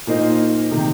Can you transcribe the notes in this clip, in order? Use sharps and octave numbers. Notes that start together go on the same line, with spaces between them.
A#2 A#3 D#4 C5 D#5
C3 D#3